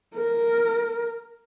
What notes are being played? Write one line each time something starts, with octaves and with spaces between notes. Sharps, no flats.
A#4